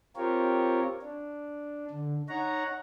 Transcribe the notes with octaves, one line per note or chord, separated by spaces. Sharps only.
C4 F4 G4 A#4 C#5
D4
D3
D#4 C#5 F#5 A#5